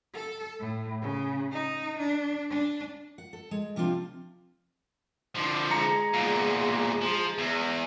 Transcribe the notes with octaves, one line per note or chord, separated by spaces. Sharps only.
A4
A2
C#3
D#4
D4
D4
F#5
A4
G#3
C3 F3 D4 F4
D3 F3
G#3 G#4 A#5 C#7
E2 A#2
F3
E2